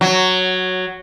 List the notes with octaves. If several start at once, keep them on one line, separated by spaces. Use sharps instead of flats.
F#3